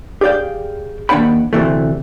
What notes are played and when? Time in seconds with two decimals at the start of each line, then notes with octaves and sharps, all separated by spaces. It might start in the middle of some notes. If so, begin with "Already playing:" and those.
0.21 G4 G#4 D5 F5 G5
1.09 D#2 G#3 D4 F#5 G5 B5
1.53 D2 C3 E3 A3